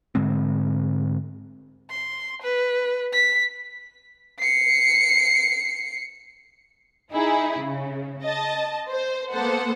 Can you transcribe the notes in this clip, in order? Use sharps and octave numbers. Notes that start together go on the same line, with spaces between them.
G#2 D3 G#3 C4
C6
B4
B6
C7 C#7
D#4 E4 G#4
C#3
D#5 A5
C5
A#3 B3 A4 C5 F#5